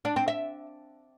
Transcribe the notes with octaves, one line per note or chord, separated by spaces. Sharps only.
D4
C4
E5